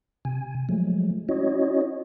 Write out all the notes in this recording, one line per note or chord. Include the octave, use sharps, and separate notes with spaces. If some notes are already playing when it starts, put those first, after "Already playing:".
C3 G#5
F3 F#3 G#3 A3
C#4 E4 F#4 C#5 D#5